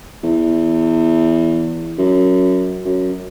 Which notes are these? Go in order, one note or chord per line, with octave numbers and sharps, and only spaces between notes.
E2
F#2
F#2